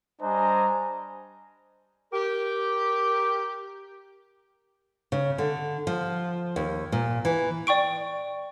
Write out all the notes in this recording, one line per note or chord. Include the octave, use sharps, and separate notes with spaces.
G3 D4 C5 D#5 G#5 A#5
G4 A#4
C#3
D3
F3
D#2
A#2
E3
D5 G5 C#6 D7